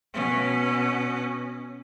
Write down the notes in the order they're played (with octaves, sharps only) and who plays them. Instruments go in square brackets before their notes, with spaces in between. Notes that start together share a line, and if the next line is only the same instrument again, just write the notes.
[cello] B2 C#4